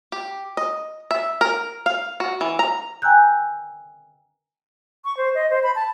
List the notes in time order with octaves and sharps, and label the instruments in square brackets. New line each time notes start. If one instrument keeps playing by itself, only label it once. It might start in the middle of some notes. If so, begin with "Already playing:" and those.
[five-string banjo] G4
D#5
E5
A#4
F5
F#4
E3
A#5
[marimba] G5 G#5 A#5 E6 F#6 G6
[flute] C#6
C5
D#5
C5
B5
A5